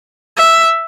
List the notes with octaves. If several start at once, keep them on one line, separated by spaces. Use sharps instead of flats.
E5